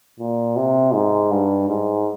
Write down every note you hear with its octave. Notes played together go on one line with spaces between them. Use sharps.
A#2
C3
G#2
G2
G#2